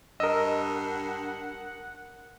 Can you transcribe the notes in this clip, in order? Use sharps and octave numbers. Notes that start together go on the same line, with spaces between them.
G2 A#4 D#5 F#5 E6